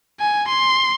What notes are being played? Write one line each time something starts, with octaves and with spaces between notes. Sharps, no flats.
G#5
C6